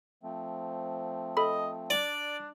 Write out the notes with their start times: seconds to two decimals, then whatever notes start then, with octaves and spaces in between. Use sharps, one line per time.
0.23 F3 A3 C4
1.37 A4 D#5 B5
1.90 D4 D5 D6